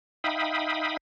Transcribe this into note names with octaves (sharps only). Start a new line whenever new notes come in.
D#4 E5 F5 G5 B5 D#6